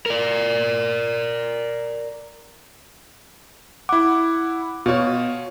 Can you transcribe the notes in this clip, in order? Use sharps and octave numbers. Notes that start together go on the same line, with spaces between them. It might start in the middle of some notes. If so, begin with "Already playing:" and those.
A#4 D5
E4 F#5 D6
B2 F4 C#5